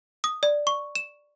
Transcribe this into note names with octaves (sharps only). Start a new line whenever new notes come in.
D#6
D5
C#6
E7